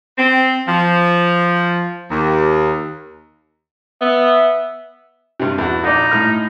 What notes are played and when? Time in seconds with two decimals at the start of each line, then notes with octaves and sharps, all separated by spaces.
0.18 C4
0.68 F3
2.11 D#2
4.01 B3 E5
5.40 G2 C3
5.58 E2 F#4
5.84 A#1 D#4 D5
6.11 A2 F6